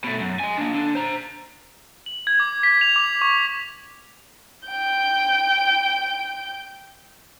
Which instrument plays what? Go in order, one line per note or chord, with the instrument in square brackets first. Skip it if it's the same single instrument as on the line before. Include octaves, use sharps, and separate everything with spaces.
[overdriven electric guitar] B2 A3
F#2
D#5 G#5
A#3 D4
D3 D4
C5 A#5
[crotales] F#7
G#6
D6
B6
F7
D6
C#6
[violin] G5 G6